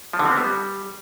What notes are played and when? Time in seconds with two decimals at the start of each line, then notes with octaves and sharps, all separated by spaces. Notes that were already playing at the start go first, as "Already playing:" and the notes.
0.13 F3
0.19 D3
0.25 C4
0.31 B3
0.37 G3